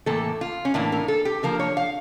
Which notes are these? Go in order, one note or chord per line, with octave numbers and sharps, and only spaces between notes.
A2 E3 A#3 A4
F4
C#4
A2 E3 A#3 D4
A#4
A4
G4
D3 F3 A#3 A#4
C#5
F5